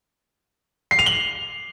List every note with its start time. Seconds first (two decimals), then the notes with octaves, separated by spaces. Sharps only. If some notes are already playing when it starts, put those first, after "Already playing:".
0.91 C7
0.99 F7
1.06 F#7